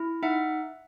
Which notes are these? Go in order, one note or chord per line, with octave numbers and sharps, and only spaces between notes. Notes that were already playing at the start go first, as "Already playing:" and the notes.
Already playing: E4
D#4 E5 F#5